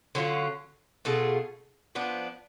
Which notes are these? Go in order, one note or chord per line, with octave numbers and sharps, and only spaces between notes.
D3 F#3 C#4 F4
B2 A3 F4 G#4
F3 B3 D4